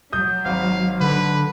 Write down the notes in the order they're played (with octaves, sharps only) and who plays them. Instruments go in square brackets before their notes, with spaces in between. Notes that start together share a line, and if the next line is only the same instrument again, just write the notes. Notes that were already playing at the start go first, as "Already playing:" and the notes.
[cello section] F#3 [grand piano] D#6 G6
[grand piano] G#1 [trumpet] F5
[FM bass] D3 [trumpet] B4